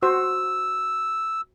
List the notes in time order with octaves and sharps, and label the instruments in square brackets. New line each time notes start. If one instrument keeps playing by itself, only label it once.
[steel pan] F#4 C5 [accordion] E6